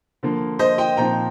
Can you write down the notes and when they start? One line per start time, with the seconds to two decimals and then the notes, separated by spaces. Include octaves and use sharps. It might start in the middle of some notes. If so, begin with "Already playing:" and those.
0.23 D3 F3 A#3
0.59 C5 D#5
0.78 D#5 G5
0.97 A#2 F3 C4 D#4 G5 A#5